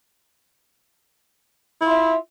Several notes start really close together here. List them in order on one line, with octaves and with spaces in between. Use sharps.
E4 F4 E5